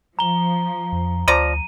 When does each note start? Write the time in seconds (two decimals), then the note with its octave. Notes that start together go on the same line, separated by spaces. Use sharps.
0.19 F3 A#5 G7
0.92 F2
1.28 D2 F3 D5 A#5 D#7